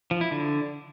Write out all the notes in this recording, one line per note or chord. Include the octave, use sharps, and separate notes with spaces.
F3
E4
D3